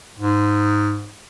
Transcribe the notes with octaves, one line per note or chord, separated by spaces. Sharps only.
G#2